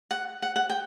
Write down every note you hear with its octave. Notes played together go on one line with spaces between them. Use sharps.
F#5
F#5
F#5
G5